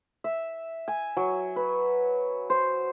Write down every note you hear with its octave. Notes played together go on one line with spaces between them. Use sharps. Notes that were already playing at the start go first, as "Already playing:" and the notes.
E5
G#5
F#3
B4
C5